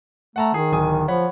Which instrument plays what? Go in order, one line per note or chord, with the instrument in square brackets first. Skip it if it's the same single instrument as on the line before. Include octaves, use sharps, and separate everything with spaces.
[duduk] A3 [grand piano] F#5 A5 A#5
[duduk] D#3 [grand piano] G#4
[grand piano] D1 G#5 D#6
[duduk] F3 [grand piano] C#5 F#5 B5